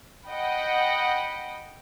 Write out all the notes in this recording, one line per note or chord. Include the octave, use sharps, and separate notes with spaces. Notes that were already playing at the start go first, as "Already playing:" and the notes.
D#5 F#5 G5 B5